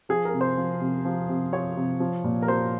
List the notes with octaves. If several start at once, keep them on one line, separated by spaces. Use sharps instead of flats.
F3 G#4
A#4
C3
C5
F3
C3
F3
C3
F3 C#5
C3
F3
A#2
A#4
F3 C5